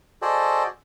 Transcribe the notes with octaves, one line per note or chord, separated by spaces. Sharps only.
F#4 G#4 A4 C5 D5 D#5